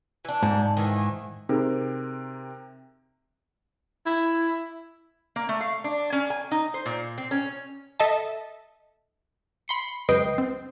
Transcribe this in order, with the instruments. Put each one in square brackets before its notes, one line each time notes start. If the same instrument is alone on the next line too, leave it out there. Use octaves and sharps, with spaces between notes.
[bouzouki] E3 D4
[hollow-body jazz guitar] G#2
[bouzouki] D#3 E3
[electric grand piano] C3 C4 A#4 [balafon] D#4 G#4
[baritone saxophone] E4
[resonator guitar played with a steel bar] A#3
A3
F5
D4
C#4
G#5
D#4
C5
A#2
C4
C#4
[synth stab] A4 D#5 E5 A5
B5 C6 C#7
C#2 F#2 B4 D#5 G5 C7
C4